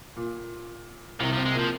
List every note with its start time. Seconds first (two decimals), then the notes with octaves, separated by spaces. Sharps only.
0.16 A#2
1.20 C2 C3 D#3
1.33 F3
1.37 C3 C4
1.45 G#3
1.55 A#2 F3 A#3